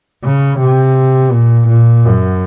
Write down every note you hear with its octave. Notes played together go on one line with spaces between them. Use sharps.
C#3
C3
A#2
A#2
F#2